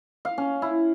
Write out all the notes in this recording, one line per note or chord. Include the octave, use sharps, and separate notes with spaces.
F5
C#4
E4